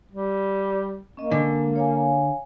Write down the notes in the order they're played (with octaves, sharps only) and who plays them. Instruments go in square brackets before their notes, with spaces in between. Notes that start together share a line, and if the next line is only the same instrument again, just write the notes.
[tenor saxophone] G3
[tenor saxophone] A#3 [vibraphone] C#4 D#5
[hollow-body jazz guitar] D3 [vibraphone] G#3
[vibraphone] C#5 F5 G#5